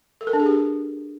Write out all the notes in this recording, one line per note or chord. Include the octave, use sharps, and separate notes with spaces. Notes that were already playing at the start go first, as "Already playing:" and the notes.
A4
A#4
D4
G#4
G4